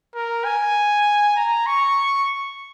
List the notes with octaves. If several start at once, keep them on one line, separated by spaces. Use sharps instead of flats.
A#4
G#5
A#5
C#6